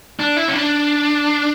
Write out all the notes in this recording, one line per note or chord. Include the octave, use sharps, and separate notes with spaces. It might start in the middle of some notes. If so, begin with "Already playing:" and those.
D4
E4
C#4
D4